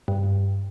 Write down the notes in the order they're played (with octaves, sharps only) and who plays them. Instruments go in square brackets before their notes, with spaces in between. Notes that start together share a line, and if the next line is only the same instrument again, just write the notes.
[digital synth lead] G2